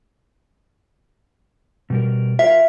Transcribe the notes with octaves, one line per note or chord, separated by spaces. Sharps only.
B2 G3 A#4
F4 A#4 E5 F5